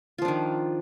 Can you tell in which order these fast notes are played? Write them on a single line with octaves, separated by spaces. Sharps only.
F4 F3 D4 D#3